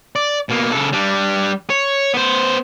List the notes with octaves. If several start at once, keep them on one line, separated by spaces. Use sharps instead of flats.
D5
B2 A#3
C#3 A4
G3 D4
C#5
B3 C5